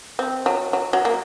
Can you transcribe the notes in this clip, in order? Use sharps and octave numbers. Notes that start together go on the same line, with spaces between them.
C4
F#3
F#3
F#3
A#3